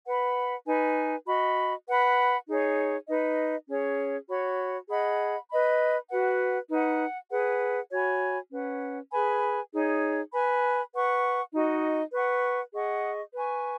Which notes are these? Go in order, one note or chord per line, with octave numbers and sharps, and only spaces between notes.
B4 F#5 B5
D#4 B4 G#5
F#4 D#5 B5
B4 F#5 B5
D#4 G#4 C#5
D#4 B4 D#5
C#4 G#4 C#5
F#4 C#5 B5
G#4 D#5 F#5 B5
B4 D#5 B5
F#4 B4 F#5
D#4 B4 F#5
G#4 B4 F#5
F#4 C#5 G#5 B5
C#4 B4 F#5
G#4 B4 G#5 B5
D#4 G#4 C#5
B4 G#5 B5
B4 F#5 C#6
D#4 F#4 D#5
B4 F#5 C#6
G#4 D#5 F#5 C#6
B4 G#5 C#6